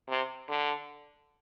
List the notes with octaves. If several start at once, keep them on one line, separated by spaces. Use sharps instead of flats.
C3
D3